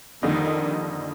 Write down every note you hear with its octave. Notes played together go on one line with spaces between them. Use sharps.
F2 D3 D#3 G3 A#3 D#4